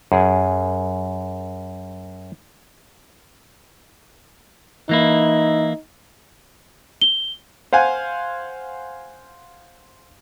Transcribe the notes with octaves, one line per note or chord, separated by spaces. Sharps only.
F#2 G#4
E3 A#3 D#4 E4
G7
C5 F5 F#5 G#5